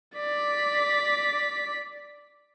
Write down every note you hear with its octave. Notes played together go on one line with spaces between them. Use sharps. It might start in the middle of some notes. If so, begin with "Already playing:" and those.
D5 B6